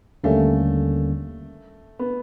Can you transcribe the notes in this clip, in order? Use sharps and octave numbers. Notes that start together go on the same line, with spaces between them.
D#2 D3 G3 A3 A#3 C#4
B3